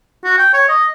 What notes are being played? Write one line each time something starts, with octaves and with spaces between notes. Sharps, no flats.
F#4
G5
C#5
D#5